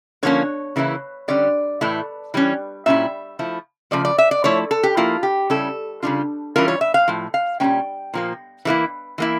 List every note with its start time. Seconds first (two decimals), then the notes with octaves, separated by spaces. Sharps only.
0.23 D3 F3 A#3 C#4 C#5
0.76 C#3 E3 A#3 C#4 E4
1.28 D3 G3 C#4 D5
1.81 A2 E3 A3 E4
2.34 E3 G3 C#4
2.86 A#2 G3 C#4 E4 E5
3.39 F3 A3 E4
3.91 C#3 F3 A3 D5
4.05 D5
4.18 E5
4.31 D5
4.44 F3 A3 E4 C#5
4.71 A4
4.83 G4
4.97 F3 A#3 E4 F4
5.23 G4
5.50 C#3 G3 C#4 E4 A4
6.03 C#3 G3 D4 F4
6.56 E3 G3 C#4 F4 A#4
6.68 C#5
6.81 E5
6.94 F5
7.08 A2 F3
7.34 F5
7.60 A#2 G3 A#3 C#4 G5
8.14 A#2 F3 A#3
8.65 E3 G3 A#3 E4
9.18 E3 A#3 E4